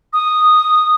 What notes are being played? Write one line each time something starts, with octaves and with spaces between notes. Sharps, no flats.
D#6